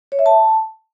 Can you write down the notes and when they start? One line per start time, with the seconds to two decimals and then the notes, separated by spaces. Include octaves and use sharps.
0.12 C#5
0.19 E5
0.26 A5